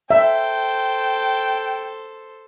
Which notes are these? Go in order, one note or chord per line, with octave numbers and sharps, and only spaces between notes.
A4 C5 E5 G5